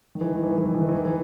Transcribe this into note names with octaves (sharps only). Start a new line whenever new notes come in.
D#3
E3
D#3
E3
D#3
E3
D#3
E3
D#3
E3
D#3
E3